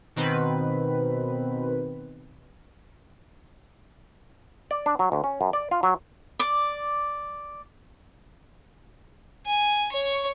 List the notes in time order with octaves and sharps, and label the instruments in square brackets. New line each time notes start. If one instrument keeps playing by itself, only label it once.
[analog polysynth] B2 D#3 C4 B4
[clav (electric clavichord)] D5
D4
F#3
D2
C#4
F#2
D5
F4
F#3
[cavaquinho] D5 D6
[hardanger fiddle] G#5
C#5 C#6